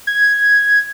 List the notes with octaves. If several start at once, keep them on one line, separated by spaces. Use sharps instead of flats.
G#6